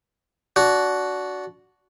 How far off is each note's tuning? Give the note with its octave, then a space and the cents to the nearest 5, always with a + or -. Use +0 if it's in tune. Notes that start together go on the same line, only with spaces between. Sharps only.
D4 -20 F#4 +0